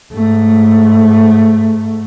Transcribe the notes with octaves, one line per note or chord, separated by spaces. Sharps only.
G#2 A3